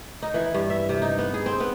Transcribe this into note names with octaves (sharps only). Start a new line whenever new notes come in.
D#4
E3
G2
E5
C3
D#4
B3
G#4
C4
B3